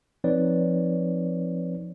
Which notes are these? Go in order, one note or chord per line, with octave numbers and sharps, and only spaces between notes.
F3 C4 D#4 B4 C#5 D5